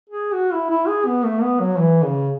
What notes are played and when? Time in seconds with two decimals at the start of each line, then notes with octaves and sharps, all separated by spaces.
0.10 G#4
0.34 F#4
0.53 E4
0.71 E4
0.88 G#4
1.06 B3
1.25 A3
1.42 B3
1.60 F#3
1.79 E3
2.03 C#3